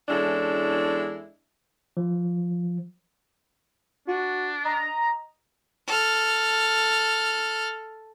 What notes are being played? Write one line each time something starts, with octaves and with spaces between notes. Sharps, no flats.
E2 G#3 C#4 D4 E4 A4
F3
D4 F#4
D#5 A#5
A4 F6